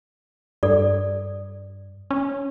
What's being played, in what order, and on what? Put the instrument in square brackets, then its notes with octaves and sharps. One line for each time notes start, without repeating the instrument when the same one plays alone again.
[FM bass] G2 [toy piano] A4 D5
[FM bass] C#4